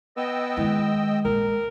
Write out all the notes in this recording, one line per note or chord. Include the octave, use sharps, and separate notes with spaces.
B3 D#5 G5 E6
D#3 G#3 E4
A#1 A#4